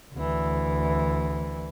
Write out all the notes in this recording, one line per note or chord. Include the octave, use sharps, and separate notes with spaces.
D2 E3